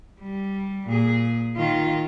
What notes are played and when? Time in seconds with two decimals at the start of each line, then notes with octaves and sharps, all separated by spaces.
0.21 G3
0.87 A#2 G#4
1.57 D#3 F4